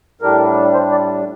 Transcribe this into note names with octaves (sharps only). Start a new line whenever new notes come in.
A2 G3 D4 A#4
C5
D5